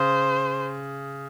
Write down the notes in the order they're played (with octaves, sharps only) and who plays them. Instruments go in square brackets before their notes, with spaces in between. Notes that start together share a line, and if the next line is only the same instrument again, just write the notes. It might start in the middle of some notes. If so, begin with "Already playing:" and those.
Already playing: [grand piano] C#3 [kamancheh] C5